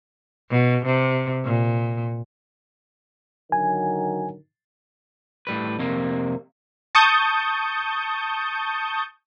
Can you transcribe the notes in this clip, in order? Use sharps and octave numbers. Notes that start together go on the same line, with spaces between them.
B2
C3
A#2
D3 D#3 F#3 G#5
A2 G3 B4
F2 C3 A#3
A5 C#6 D#6 G6